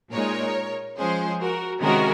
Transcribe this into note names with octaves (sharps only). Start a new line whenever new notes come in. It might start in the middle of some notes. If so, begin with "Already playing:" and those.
A#2 G#3 D#4 A#4 C#5
F3 G#3 C#4 G#4 C5
F#4 A#4
C3 D#3 G#3 C#4 F#4 A#4